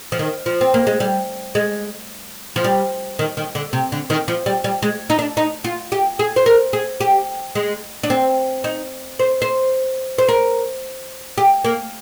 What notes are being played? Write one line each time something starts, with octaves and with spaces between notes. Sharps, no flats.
F3
D#3
F3
C4
A#3
G#3
G3
G#3
F3
G3
D#3
D#3
D3
C3
D3
D#3
F3
G3
G3
G#3
D#4
D4
D#4
F4
G4
G#4
C5
A#4
G#4
G4
G#3
D4
C4
D#4
C5
C5
C5
A#4
G4
A#3